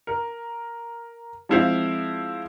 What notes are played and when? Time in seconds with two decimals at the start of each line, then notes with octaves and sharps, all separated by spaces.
0.07 A#4
1.49 F3 G#3 C4 E4 C5 F5